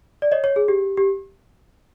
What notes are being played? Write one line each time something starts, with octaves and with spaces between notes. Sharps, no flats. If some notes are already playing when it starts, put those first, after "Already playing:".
D5
C#5 D#5
C#5
G#4
G4
G4